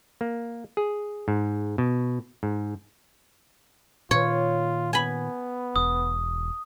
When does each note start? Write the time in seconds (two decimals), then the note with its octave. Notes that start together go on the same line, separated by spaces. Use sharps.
0.21 A#3
0.77 G#4
1.28 G#2
1.78 B2
2.43 G#2
4.11 A#2 D#3 F4 C#5
4.93 B3 G#5 B5
5.76 E1 D#6